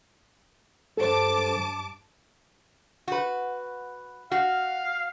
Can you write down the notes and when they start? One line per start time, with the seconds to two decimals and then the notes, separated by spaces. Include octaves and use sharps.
0.97 G2 A4 C5 A5 D6
3.08 F#4 B4
4.32 F#4 F5